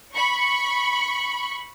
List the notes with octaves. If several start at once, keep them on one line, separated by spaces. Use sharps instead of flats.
B5 C#6